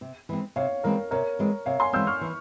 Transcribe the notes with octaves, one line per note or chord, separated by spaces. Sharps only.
C3
E3 G#3 C4
C3 C#5 F5
E3 G#3 C4 A#4 C#5
C3 A#4 C#5
E3 G#3 C4
C3 C#5 F5
G#5 C6
E3 G#3 C4 E6 G6
C#6 F6
E3